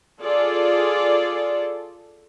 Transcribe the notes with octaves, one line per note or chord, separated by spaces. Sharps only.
F4 G#4 A4 D5